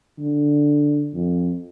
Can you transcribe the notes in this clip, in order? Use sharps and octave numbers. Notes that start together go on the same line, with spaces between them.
D3
F2